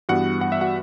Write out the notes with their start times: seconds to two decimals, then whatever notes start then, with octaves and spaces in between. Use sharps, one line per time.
0.09 G2 E3 G3 B3 F#4 F#5
0.41 F#5
0.52 E5
0.61 F#4 F#5